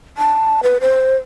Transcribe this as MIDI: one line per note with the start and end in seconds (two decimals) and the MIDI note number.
0.17 0.60 81
0.63 0.78 71
0.81 1.17 72